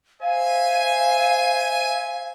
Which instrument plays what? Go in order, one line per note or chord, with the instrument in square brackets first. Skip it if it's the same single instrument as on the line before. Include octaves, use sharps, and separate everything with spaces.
[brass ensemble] C5 E5 G#5 [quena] F5